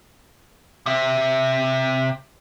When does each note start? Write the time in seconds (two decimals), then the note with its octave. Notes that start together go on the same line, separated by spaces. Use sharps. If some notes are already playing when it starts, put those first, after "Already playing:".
0.86 C3 E5